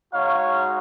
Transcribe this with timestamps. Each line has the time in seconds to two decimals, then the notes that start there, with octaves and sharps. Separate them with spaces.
0.12 G#3 D#4 F#4 C#5 F5